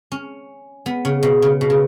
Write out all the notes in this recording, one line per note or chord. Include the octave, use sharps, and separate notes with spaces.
C#4
B3
C#3
B2
C#3
B2
C#3